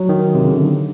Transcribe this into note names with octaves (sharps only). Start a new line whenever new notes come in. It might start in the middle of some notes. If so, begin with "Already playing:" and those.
Already playing: F#3
D#3
C3
C#3
D3